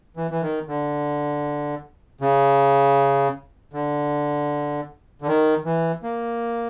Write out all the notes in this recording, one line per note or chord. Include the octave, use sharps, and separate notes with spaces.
E3
E3
D#3
D3
C#3
D3
D3
D#3
E3
A#3